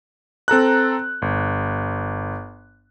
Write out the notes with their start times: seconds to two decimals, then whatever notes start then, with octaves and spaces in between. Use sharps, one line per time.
0.48 C4 A4 A#5 F#6
1.22 G1